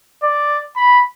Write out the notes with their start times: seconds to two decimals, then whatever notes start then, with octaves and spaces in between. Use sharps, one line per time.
0.23 D5
0.76 B5